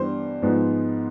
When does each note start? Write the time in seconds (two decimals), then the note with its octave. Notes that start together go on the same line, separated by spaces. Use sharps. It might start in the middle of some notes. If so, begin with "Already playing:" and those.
Already playing: G2 E3 G3 B3 C5
0.42 G#2 F3 G#3 B3